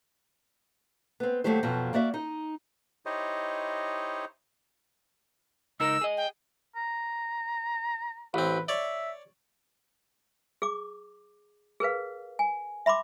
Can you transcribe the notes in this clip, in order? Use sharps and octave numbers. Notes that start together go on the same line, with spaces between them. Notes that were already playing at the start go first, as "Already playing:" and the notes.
B3 C4
D#2 A2 F#3 A3 G4 C5
F2 B2 F3 F#3
A#3 F#4 D5 E5
D#4
D#4 E4 G4 C5 C#5 D#5
C#2 D#4 A#4 E6
G#4 D#5
G5
A#5
A1 C4 B4
C#5 D5 E5
G#4 D6
G#4 A#4 B4 F5
G#5
E5 B5 C6 D6